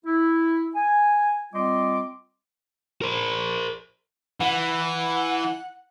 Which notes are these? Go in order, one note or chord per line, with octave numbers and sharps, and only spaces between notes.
E4
G#5
G3 C4 F4 D#5 C6 D6
A#4 C5
E3 F#5